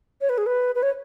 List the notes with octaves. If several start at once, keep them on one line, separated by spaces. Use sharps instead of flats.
C#5
B4
G#4
B4
B4
C#5